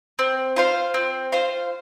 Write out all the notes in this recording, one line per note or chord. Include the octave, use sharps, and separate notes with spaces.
C4
F4 C5 F5
C4
F4 C5 F5